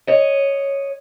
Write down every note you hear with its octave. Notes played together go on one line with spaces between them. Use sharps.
C#5 D#5